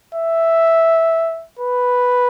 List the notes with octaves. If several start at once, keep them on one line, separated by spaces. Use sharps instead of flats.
E5
B4